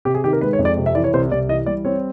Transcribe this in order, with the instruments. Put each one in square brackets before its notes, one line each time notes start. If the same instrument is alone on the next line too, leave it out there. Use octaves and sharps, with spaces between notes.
[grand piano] C3 G4
G#4
D#3 G4
A#4
G#3 B4
C#5
F2
D5
C3
E5
E3 D5
C#5
C2 C5
C2 D5
E3 D#5
G3 D5
C4 C#5